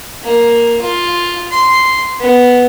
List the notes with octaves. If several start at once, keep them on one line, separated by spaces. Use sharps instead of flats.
A#3
F4
C6
B3